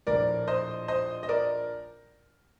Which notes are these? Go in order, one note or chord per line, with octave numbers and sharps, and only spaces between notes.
A#1 A2 A#4 D5
C5 D#5
C5 D#5
D#5
A#4 D5